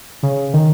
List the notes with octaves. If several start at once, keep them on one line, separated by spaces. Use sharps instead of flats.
C#3
D#3